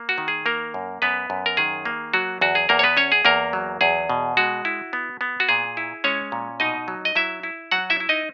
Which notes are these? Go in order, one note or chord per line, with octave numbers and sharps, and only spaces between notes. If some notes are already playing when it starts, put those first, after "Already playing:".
Already playing: A#3
F#4
D#3
G#4
A#3 A#4
F#2
F#2 B3 B4
F#2
A#4
D#3 G#4
A#3
F#3 F#4
E2 F#4
G#4
E2 A#3 A#4
C#5
B3 B4
C#4 C#5
G#4
E2 A#3 A#4
F#3
E2 G#4
B2
G#3 F#4
E4
B3
B3
F#4
A#2 G#4
E4
G#3 C#4 C#5
A#2
B2 D#4 D#5
F#3
D#5
F#3 E4 E5
E4
F#3 F#4 F#5
E4 E5
E4
D#4 D#5